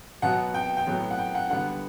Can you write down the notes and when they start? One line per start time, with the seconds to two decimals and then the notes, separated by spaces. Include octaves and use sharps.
0.22 B2 F#3 B3 F#5
0.54 G5
0.77 G5
0.87 A2 F#3 B3
1.11 F#5
1.19 G5
1.35 F#5
1.50 D3 G3 B3 F#5